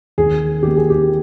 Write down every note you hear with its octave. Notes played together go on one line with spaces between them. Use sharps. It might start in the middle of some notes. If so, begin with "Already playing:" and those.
D#2 G#4
D#3 A#3 G4
G#4
G4